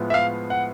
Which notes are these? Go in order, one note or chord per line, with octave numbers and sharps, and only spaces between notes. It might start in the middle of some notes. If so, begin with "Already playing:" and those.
Already playing: A2 F3 G#3 B3
E5
F5
F#5